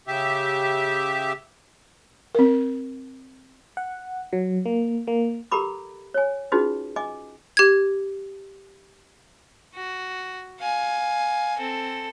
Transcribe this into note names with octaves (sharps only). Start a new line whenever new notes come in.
C#3 G4 E5
C4 A#4
F#5
F#3
A#3
A#3
G4 A4 A#4 A#5 B5 D6
C#5 G#5
C#4 D#4 F4 F#4 G#4 B4
D#5 G#5 D6
G4 G#6
F#4
F5 G#5
C4 A4